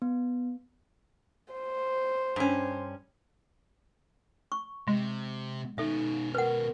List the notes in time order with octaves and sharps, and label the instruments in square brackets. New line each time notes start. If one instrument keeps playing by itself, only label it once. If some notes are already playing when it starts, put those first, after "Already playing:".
[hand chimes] B3
[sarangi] C5
[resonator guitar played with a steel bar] G2 C#4
[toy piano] C#6
[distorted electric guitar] C3 [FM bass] G#3
[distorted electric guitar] B2 C#4 [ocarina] D#4 [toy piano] A4 E5
[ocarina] A#4 [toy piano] B4 F#5